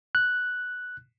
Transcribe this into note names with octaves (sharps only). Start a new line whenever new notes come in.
F#6